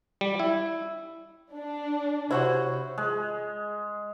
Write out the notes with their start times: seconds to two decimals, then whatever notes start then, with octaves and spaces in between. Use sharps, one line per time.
0.21 G3
0.39 E4
1.54 D4
2.31 C3 E4 F#4 C5 C#5
2.98 G#3